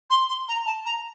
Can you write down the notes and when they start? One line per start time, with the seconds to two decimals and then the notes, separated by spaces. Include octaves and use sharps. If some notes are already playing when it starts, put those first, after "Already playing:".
0.10 C6
0.29 C6
0.48 A#5
0.66 A5
0.86 A#5